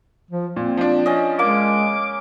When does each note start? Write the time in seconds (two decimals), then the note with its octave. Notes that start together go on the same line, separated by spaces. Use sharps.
0.31 F3
0.56 A#2 C4
0.77 F3 D4
1.06 C#4 D#5
1.39 G#3 A#3 D6